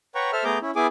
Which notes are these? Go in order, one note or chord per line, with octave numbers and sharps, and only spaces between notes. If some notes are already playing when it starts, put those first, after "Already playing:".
B4 C#5 F#5 G5 A#5 C#6
A4 C5 E5 F6
A3 B3 G#4 A#5 D6 G6
C#4 E4
B3 E4 G#4 G#5 D6